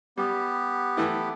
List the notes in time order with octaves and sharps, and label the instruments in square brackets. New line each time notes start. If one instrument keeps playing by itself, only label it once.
[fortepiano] G3 [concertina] B3 G4
[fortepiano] E3 A3 E4